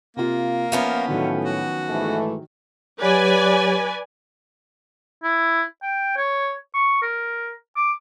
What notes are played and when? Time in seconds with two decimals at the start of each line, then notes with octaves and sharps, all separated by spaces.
0.17 C3 A#3 F4
0.72 F3 B3 C#4 E5 A#5
1.08 A2 D3 D#3 F#3
1.45 F#4
1.88 G#2 E3 A3
3.01 F#3 G4 B4 C#5 D5 G#5
5.24 E4
5.83 G5
6.17 C#5
6.75 C#6
7.02 A#4
7.76 D6